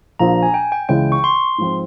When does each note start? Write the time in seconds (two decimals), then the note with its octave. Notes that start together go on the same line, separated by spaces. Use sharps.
0.19 A#1 A#2 F3 A#5
0.43 G#5
0.54 G5
0.72 G5
0.89 C#2 C#3 E3 G#3 E4 G5
1.12 C#6
1.24 C6
1.58 G#2 F3 C4